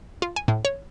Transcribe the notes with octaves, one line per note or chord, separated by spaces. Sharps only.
F4
G#5
A2
C#5